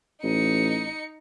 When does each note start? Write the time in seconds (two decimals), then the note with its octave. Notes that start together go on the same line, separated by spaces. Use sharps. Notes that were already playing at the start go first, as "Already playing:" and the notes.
0.23 A1 D#4 C#7